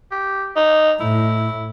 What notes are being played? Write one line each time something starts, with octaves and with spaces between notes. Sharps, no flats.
G4
D#4
A2 E4